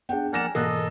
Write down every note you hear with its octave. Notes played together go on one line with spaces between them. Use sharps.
B3 D4 G#4 F#5 G5
F3 A#3 A#4 D5 F#5 G#5 A#6 E7
G#2 B2 E3 A#3 A4 D#5 F#6